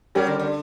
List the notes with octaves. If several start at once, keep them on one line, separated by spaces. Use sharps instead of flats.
F#3 G3 C#4 G4 A#4 D5
D3
D3